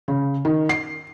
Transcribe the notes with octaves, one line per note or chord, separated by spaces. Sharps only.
C#3
D#3
C7